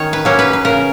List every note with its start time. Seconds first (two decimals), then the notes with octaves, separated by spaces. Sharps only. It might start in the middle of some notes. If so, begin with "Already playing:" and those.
Already playing: D#3 C#4 C#5
0.13 B4
0.25 F#3 A#3 C#4
0.39 B4
0.53 B4
0.65 C#3 A#4